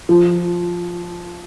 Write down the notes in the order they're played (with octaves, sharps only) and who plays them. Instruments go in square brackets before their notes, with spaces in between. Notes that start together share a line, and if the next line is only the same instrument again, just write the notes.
[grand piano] F3